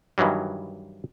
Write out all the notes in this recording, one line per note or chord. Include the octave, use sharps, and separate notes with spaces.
G2 D#3 E3 F#3 G3